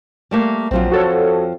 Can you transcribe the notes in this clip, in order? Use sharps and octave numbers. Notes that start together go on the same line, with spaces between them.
G3 A3 A#3
A#1 F2 F3 F#3 C4
F#4 A4 C#5